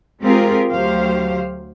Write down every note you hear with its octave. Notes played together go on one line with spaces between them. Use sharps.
G#3 C4 F4 G4 G#4 A#4
D2 F#3 G4 C5 F5